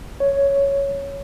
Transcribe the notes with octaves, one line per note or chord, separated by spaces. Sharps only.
C#5